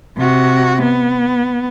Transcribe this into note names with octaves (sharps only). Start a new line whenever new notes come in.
C3 F#4
B3